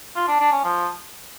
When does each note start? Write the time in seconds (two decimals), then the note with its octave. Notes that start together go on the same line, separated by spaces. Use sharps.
0.16 F4
0.28 D4
0.40 D4
0.52 C#4
0.64 F3